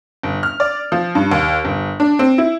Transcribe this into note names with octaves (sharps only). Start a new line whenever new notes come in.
G1
F6
D5
F3
G2
D#2
G1
D4
C4
E4